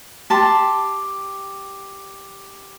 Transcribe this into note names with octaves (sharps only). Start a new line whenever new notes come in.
G4 A5 C6